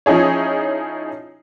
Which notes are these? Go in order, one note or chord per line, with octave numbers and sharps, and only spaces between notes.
F3 C#4 D#4 E4 G#4 C#5